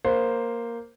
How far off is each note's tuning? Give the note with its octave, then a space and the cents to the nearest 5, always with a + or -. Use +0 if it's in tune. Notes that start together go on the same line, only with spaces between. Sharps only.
A#3 +0 C5 +0